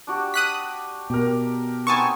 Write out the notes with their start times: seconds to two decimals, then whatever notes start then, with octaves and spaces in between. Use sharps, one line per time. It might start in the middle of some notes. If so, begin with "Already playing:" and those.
0.07 D4 F#4 G4
0.34 D#6 F#6 B6
1.10 B2 G4 A#4
1.87 B3 C4 D#4 G#5 A5 C#6